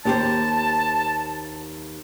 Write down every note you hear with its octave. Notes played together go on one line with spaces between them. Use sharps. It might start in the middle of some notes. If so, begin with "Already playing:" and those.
D#2 G4 C5 A5